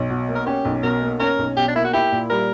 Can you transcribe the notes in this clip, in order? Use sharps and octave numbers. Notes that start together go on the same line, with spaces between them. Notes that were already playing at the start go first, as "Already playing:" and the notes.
Already playing: B1
B2
A#3
A#4
C#4 G4
B1
B2 A#4
A#3
C#4 A#4
B1
B2 G4
D4
A#3 E4
F#4
E4 G4
A#2
G3 A#4